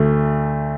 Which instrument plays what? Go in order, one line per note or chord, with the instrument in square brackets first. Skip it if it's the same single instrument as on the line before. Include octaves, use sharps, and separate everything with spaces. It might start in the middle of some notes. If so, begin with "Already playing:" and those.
Already playing: [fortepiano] D2 A3